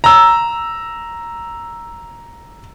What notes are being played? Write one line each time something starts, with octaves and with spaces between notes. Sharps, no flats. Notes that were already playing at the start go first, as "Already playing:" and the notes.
A#5 E6